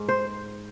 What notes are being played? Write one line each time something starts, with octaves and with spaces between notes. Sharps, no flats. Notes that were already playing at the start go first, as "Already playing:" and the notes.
Already playing: G#2
C5